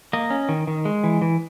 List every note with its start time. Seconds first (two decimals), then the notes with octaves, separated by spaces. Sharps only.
0.13 A#3 D#5
0.30 C#4
0.49 D#3
0.67 D#3
0.85 G#3
1.04 E3
1.22 E3